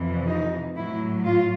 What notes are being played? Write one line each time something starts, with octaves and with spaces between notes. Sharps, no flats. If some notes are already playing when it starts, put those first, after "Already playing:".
Already playing: F2 C3 E3
D#4
A2 F#3 E4
F4